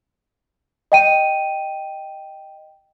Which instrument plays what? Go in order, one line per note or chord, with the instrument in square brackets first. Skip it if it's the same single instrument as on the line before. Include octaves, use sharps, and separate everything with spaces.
[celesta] D#5 G5 D#7